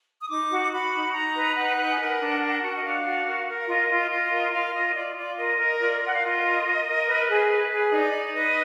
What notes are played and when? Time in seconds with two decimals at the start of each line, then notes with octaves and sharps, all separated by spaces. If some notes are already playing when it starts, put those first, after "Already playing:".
0.20 D#6
0.30 D#4 D6
0.51 F#4
0.72 F#4 B5
0.93 D#4
1.14 D#4 A#5
1.36 B4
1.57 D#4 F#5
1.77 B4
1.89 G#5
1.99 A#4 F#5
2.20 D4
2.42 A#4
2.62 F#4
2.75 D#5
2.83 D4 F5
3.05 F#4
3.26 A#4
3.47 A#4
3.58 F5
3.68 F4 D#5
3.89 F4
4.10 F4 D#5
4.31 A#4
4.53 F4 F5
4.74 F4 D#5
4.95 F4 D5
5.16 F4 D5
5.37 A#4 D#5
5.58 A#4
5.68 D#5
5.80 F4 D5
6.01 A#4 F#5
6.14 F5
6.22 F4 D#5
6.43 A#4
6.64 A#4
6.85 A#4
7.07 B4
7.28 G#4
7.49 B4
7.70 G#4
7.91 D#4 D5
8.12 D#4
8.24 D5
8.33 B4 D#5